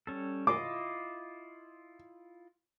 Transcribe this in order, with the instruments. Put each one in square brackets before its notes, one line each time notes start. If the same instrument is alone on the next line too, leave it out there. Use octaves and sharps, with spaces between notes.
[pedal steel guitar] G3 C#4 A4
[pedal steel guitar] E4 F4 D#5 [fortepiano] D6